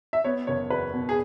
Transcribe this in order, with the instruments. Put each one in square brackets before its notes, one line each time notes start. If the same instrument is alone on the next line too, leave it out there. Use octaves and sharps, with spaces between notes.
[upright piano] E5
B3 C#5
F#1 C#5
E2 B4
B2
G#4